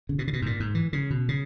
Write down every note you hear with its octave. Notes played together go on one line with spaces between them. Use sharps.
C#3
B2
C#3
B2
G#2
A#2
G#2
E3
C#3
B2
C#3